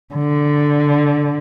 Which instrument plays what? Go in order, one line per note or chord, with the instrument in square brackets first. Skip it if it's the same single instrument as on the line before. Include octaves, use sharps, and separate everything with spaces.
[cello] D3